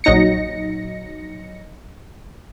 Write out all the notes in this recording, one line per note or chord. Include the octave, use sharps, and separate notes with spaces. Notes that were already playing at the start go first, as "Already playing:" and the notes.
A#1 F#3 D#4 A#6 C#7